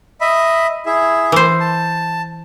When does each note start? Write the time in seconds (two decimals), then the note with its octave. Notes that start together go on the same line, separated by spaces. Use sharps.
0.21 D#5 E5 B5
0.86 E4 G#4 E5
1.32 E3 C5
1.60 A5